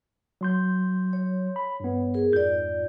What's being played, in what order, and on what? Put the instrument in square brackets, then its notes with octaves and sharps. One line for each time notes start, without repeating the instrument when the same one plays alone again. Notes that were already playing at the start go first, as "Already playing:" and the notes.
[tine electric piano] F#3 C6 G6
[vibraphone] C#5
[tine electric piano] B5
G2 B3
[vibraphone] G#4 A#4
[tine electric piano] F2 G#2 G6 [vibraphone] F4 D5